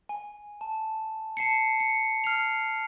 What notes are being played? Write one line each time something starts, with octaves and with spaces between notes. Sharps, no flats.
G#5
A5
A5 C7 C#7
C#7
F6 C7 F7